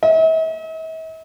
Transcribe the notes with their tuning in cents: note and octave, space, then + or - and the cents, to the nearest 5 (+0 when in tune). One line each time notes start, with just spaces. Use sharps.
E5 -45